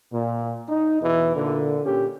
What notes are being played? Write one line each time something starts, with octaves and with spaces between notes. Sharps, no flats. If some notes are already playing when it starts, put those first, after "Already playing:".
A#2
D#4
E2 B2 E3
A#2 D3
A#2 C#4 G4